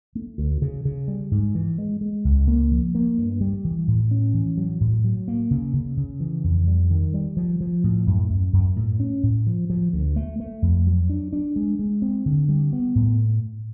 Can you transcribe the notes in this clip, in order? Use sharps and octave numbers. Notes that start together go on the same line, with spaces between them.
A3
D2
C#3
C#3
G3
G#2
E3
G#3
G#3
C#2
A#3
F3
A#3
G2
G3
E3
A2
C#4
E3
F#3
A2
F#3
A#3
C#3
C#3
C#3
E3
F2
G3
D#3
G3
F3
F3
A2
F#2
F#2
F#2
A2
C#4
A2
F3
F3
D2
A3
A3
F2
F#3
D4
D4
G#3
G#3
C4
D3
G3
B3
A2